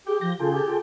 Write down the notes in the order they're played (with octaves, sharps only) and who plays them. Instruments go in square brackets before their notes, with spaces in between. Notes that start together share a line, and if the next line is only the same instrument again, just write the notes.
[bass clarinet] G4 [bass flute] G#4 [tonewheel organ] G5
[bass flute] F3 [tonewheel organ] G6 A#6
[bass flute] C#3 [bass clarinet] F4 [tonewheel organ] G#4 A4 G5
[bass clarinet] G4
[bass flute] F4